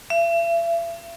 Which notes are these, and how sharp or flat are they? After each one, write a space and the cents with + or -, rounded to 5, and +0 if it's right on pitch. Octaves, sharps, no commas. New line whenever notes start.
E5 +40